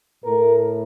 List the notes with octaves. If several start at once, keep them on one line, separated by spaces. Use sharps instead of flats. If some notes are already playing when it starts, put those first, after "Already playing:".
A2 A3 A#4